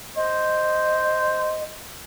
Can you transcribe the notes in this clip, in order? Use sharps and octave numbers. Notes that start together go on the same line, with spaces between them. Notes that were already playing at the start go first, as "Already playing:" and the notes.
C5 D#5